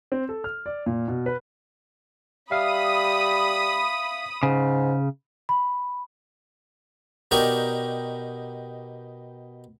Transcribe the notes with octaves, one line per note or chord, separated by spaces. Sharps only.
C4
A4
F6
D5
A#2
B2
B4
G3 E5 F5 B5 D#6
G#2 C#3
B5
B2 D#4 G4 A#4 D5 C#6